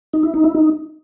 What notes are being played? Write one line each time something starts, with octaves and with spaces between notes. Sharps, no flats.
D#4
E4
D#4
E4
D#4